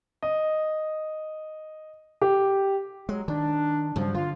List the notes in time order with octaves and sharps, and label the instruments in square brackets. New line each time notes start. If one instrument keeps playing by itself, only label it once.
[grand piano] D#5
G4
[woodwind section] F#3 [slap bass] G#3
[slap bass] D#3 [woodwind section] D4
[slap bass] G2 C#3 F#3 [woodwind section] F3
[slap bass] D3 [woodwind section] F4